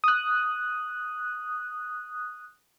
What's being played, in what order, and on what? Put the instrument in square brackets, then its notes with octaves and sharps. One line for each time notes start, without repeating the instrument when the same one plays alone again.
[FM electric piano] D#6 F#6